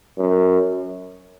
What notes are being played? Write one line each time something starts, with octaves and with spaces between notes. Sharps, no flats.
F#2